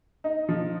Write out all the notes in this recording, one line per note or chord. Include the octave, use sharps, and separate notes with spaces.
D#4
F3